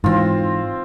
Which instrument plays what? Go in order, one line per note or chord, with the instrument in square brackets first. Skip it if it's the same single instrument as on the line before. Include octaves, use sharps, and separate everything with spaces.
[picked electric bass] G#2 E3 [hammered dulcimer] C4 F4